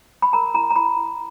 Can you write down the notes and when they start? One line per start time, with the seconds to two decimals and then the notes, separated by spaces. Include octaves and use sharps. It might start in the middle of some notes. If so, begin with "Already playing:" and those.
0.22 B5
0.33 A#4 A#5
0.54 E4 A#5
0.70 A#5
0.76 E4 B5
0.96 E4